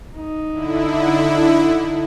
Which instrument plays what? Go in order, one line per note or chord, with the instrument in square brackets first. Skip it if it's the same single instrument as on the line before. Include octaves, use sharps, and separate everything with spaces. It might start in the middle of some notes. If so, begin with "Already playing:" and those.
[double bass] D#4
[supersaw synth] D3 E4